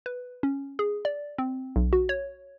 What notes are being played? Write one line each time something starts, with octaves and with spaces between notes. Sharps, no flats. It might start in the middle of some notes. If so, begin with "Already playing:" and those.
B4
C#4
G#4
D5
C4
B1
F#4
C#5